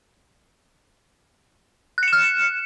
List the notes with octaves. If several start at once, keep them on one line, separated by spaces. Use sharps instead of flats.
F6 F#6 C#7 E7